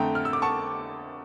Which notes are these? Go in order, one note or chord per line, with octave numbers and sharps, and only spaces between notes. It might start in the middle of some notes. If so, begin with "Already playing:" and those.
Already playing: F2 D3 A3 G5 A#5
F6
E6
D6
A5 C#6